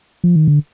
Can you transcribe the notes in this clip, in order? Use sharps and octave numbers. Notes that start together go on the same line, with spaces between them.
F3
D#3
D3